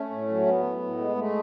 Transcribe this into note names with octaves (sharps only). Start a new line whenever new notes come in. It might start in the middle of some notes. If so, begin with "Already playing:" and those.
Already playing: A3 C#4
A2
F#3
A2 B3
A2
A2
G#3
G#3 A3